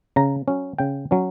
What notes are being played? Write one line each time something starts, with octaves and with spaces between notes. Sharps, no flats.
C#3 A#5
F#3 C#4
C#3 G5
F#3 C#4